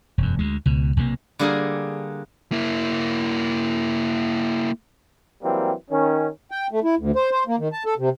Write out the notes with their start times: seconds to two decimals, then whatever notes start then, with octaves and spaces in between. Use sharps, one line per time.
0.18 E1 F#2
0.39 D2 G#3
0.66 C#2 B2
0.97 B1 C3 D#3 A#3
1.39 D3 G3 A#3 G#4 A#4 G#5
2.52 A#3 E4
5.43 E3 F#3 G3 A#3 C4
5.90 D#3 C#4
6.51 G5
6.72 A3
6.84 E4
6.98 D2
7.16 C5
7.31 C5
7.47 A#3
7.59 D#3
7.72 A5
7.86 A4
7.98 C3